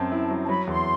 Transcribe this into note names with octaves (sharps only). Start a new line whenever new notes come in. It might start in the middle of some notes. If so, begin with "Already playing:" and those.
Already playing: F#2 C4 A5
E4
F#3
A5
F#3 B5
E2 C6